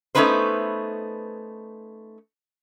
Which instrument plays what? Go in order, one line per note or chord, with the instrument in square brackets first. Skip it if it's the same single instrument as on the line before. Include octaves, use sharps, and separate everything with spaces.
[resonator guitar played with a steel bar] A3 B3 C#4 D#4 B4 C5